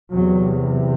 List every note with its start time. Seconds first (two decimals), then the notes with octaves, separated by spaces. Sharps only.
0.13 E2 C3 F#3